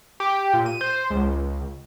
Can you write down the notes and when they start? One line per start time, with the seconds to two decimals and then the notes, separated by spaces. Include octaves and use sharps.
0.20 G4
0.53 A#2
0.66 D#7
0.81 C5
1.10 C#2